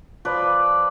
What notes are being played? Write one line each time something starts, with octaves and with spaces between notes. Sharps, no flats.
F3 B4 D5